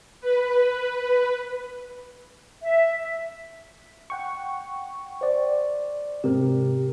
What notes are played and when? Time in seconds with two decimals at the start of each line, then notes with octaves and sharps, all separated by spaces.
0.21 B4
2.62 E5
4.10 F#5 G5 C#6
5.21 C5 D5
6.24 G#2 C3 G4 A#4